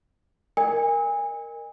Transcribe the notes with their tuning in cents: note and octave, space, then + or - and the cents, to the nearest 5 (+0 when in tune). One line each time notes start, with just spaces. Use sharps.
A#4 +0 D#5 -45 G#5 -30